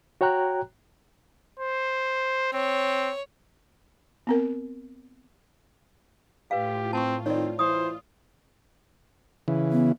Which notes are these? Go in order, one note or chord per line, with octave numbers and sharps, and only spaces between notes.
F#4 C#5 G5 A#5 F#6
C5
C4 C#5
B3 C4 A#4
A2 F4 G4 B4 F5
C4 A5 C#6
D#3 C4 C#5 D5
E3 F4 C5 D#6
C#3 E3
B3